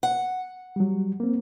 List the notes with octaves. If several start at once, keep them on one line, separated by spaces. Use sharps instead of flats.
F#5
F#3 G3
A#3 C4